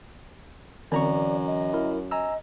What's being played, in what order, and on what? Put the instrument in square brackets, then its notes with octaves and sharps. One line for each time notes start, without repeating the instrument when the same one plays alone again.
[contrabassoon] F#2 [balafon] D3 C4 [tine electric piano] E3 A#5 C#6 [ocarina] D5
[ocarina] D#5
[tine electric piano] E4 A#4
[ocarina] D#5 [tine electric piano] G#5 A#5 E6